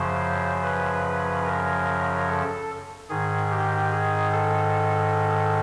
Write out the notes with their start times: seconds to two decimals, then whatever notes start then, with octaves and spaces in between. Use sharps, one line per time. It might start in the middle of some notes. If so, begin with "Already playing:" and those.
Already playing: F#2 C#3 F3 C5
0.63 B4
1.45 A#4
2.28 A4
3.09 G#2 D#3 G#4
3.51 G4
3.92 G#4
4.32 A4